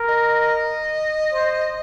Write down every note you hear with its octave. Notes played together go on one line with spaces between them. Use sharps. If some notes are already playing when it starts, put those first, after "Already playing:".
Already playing: A#4
D#5
C5